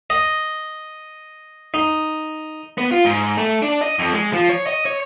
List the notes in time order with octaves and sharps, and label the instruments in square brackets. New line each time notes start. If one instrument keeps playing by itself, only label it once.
[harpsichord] D#5
D#4
[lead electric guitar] B3
F4
G#2
A3
D4
D#5
F2
G#3
F3
C#5
D#5
C#5